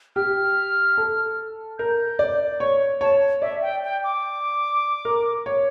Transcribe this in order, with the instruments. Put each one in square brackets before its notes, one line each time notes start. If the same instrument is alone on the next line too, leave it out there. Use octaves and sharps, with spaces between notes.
[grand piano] G4 [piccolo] F6
[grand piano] A4
[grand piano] A#4 [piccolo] G6
[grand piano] D5
[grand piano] C#5 [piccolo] C#6
[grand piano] C#5 [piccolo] A5
[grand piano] D5 [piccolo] E5
[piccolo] G5
G5
D6
[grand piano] A#4
C#5